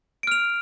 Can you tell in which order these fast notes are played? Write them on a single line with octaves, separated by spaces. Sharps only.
D7 F6 F7